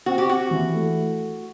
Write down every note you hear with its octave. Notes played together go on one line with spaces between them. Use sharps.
C4 F#4
G4
F#4 G4
E3
A3